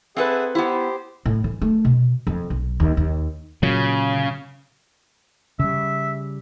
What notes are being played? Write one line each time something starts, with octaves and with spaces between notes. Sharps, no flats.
C4 G#4 A4 B4 E5 F#5
B3 E4 G4 C5
A2
E3
A3
B2
F2
B1
D#2
D#2
A#2 C#3 F#3
C#3 G3 E5